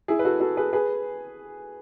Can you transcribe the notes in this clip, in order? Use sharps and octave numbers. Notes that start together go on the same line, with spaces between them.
E4 G#4
B4
F#4 A4
F#4 A4
G#4 B4
G#4 B4